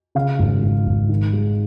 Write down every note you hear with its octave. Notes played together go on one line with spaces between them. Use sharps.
C#3 F5
G#1
G#1
G#1
D#3
G#3